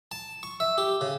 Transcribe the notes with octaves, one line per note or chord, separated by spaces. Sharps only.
A5
C#6
E5
G4
C#3